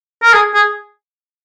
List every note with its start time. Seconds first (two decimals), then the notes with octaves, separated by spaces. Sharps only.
0.23 A#4
0.33 G#4
0.54 G#4